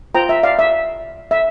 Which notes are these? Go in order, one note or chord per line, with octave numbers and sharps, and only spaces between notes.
F4 C5 G5 A#5
E5
D5 F5
E5
E5